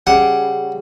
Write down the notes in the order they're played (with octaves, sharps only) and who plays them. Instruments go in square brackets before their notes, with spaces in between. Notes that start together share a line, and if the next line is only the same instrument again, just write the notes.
[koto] C#3 G3 [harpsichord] F#5